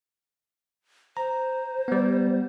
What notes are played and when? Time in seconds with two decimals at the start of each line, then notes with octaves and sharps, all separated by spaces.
1.17 C5 A#5
1.88 G3 B3